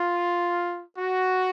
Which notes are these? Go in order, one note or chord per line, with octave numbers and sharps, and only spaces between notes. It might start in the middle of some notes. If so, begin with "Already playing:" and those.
Already playing: F4
F#4